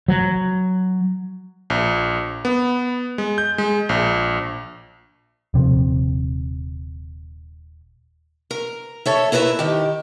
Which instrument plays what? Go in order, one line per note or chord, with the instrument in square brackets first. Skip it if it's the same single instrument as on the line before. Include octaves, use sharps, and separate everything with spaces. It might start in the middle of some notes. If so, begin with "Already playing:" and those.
[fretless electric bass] F#3
[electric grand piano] A#1
B3
G#3
G6
G#3
A#1
[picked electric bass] D#1 C3 F3
[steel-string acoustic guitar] A#4
A4 C#5 E5
E4 A#4 B4 D#5 E5
D#3 G4